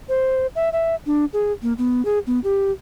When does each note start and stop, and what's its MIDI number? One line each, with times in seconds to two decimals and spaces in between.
0.09 0.47 72
0.56 0.72 76
0.73 0.95 76
1.06 1.25 62
1.33 1.52 68
1.62 1.73 58
1.78 2.04 59
2.05 2.19 68
2.27 2.39 59
2.44 2.71 67